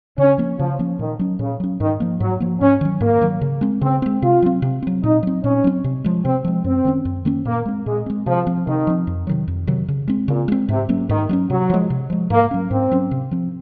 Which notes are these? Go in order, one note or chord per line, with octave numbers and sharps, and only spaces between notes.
C#3 C#4
F3 A#3 C#4
C#3 F3
F3 A#3 C#4
A#2 D#3
F#3 C#4
A#2 C#3
F#3 C#4
G#2 D#3
F3 A#3
G#2 F#3
F3 A#3
G#2 C#4
D#3 F#3
G#2 A#3
D#3 F#3
C#3
G#3 C4
C#3 C4
G#3 C4
C3 F4
F#3 C4
C3
F#3 C4
A#2 D#4
F#3 C4
A#2 C#4
F#3 C4
C3
F3 G#3
C3 C4
F3 G#3
F#2 C4
D#3 A#3 C#4
F#2
D#3 A#3 C#4
A#2 A#3
G#3 C4
A#2 G#3
G#3 C4
C3 F3
F3 C4
C3 D#3
F3 C4
F2
C3 D#3 F#3
F2
C3 D#3 F#3
C#3
G#3 C4
A#2 C#3
G#3 C4
G#2 C3
F#3 A#3 C#4
G#2 D#3
F#3 A#3 C#4
C3 F#3
F3 G#3
C3
F3 G#3
G#2 A#3
F#3 C#4
G#2 C4
F#3 C#4
C3
F3 C4